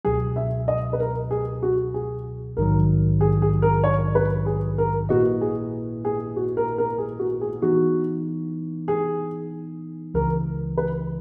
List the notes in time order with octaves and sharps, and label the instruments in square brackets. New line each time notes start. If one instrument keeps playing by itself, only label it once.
[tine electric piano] C#2 B2 F#3 [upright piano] G#4
[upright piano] E5
D#5
B4
A#4
G#4
F#4
G#4
[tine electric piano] A#1 G#2 D#3 F#3 [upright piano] A#4
[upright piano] G#4
G#4
A#4
C#5
B4
G#4
A#4
[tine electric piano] A#2 A#3 E4 B4 D#5 [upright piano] F#4
[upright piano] G#4
G#4
F#4
A#4
A#4
G#4
F#4
G#4
[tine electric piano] E3 B3 D#4 [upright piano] F#4
[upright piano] G#4
[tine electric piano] C#2 C#3 E3 [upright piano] A#4
[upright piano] B4